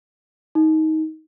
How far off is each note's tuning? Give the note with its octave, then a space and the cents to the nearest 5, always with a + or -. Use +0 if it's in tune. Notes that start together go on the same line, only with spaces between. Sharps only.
D#4 +20